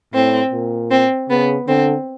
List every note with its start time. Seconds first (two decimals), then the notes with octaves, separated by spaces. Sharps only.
0.14 A2 C4
0.52 A#2
0.91 C4
1.30 C#3 B3
1.68 D3 C4